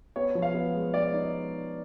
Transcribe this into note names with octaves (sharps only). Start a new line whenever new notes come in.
B3 C#5
F3
F5
B3
G#3
G#3 D5
D#4